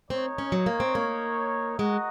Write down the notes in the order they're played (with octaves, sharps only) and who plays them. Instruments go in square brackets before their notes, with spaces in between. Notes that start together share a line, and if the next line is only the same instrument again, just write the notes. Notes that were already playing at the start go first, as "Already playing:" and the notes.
[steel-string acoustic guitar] C4 [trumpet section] D#4 A#4 C#5
[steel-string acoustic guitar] C#4
F#3
A#3
C4
A#3
[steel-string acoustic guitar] G#3 [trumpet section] F#4 A#4 D#5 F#5